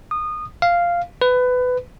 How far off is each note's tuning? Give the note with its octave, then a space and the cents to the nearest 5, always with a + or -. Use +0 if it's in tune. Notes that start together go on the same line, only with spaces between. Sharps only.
D#6 -25
F5 -5
B4 +20